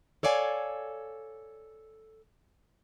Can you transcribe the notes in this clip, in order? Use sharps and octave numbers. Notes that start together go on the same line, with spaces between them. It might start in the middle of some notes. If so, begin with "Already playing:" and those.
A4 C#5 D5 F5 G#5